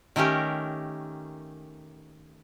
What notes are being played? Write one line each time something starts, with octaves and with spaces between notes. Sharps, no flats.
D#3 A3 C#4 G4 A#4